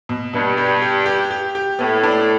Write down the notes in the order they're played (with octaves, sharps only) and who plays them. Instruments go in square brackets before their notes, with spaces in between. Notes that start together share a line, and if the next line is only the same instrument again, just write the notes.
[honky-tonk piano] B2
[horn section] G2 [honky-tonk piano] B2
[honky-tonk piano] G4
G4
G4
G4
G4
[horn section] A2 [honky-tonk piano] B3
[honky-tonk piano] D4